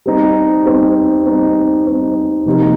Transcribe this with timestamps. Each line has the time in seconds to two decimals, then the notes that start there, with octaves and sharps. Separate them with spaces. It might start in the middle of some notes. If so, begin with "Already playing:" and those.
0.06 G3 C4 D#4
0.65 G3 C4 D#4
1.26 G3 C4 D#4
1.85 G3 C4 D#4
2.46 C3 F3 A#3 D#4 G4